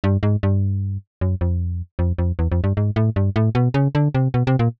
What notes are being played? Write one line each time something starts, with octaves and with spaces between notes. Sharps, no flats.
G2
G#2
G2
F#2
F2
F2
F2
E2
F2
G2
G#2
A2
G2
A2
B2
C#3
D3
C3
B2
C3
A#2